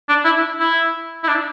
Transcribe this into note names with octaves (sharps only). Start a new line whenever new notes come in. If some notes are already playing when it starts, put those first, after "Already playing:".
D4
E4
E4
E4
D4